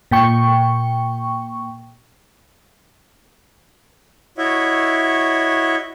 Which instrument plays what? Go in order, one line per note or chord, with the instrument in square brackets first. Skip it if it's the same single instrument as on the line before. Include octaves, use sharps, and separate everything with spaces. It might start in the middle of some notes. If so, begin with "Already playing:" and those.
[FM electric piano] A#2 G5 C#6
[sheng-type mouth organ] E4 F#4 C#5 D#5 E5